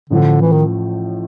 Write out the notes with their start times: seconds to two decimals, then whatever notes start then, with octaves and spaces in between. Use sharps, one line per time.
0.10 A1 A2 D3 F3
0.41 E3
0.52 D#3